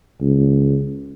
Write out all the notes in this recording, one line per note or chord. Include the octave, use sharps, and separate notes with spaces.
C#2